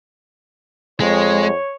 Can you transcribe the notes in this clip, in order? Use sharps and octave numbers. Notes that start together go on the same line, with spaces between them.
F2 G#3 C#5